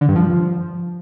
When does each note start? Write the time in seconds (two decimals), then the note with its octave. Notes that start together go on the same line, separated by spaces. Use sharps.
0.01 D3
0.08 G2
0.16 F3